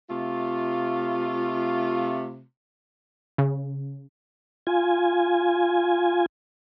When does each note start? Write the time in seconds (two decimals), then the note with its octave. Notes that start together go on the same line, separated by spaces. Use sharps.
0.10 C3 A3 F4
3.38 C#3
4.67 F4 G#5